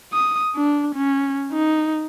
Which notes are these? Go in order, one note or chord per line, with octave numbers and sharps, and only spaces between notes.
D#6
D4
C#4
D#4